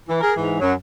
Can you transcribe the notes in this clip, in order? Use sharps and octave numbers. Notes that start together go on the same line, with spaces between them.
E3
G#4 A#4
G#2 E3
F#2 F#3